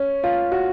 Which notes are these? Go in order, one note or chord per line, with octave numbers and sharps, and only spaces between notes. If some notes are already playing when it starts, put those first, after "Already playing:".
Already playing: C#4
F4
F#4